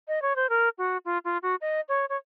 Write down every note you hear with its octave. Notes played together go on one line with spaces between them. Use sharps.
D#5
C#5
C5
A#4
F#4
F4
F4
F#4
D#5
C#5
C#5